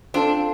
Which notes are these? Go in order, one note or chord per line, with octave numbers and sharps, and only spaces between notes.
C4 D4 F4 A4 C5